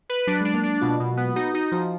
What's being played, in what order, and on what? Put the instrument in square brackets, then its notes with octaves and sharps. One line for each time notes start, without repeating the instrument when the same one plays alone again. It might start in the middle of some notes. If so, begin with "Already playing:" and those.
[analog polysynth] B4
[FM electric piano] F#3 [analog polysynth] D4
[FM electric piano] G#3 [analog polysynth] D4
[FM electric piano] A#3
[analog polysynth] D4
[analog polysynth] B2 [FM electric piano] F4
[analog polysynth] B2
B3
[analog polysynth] D#4 [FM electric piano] F#4
[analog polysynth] D#4 [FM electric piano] F#4
[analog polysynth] F3 [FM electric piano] F#4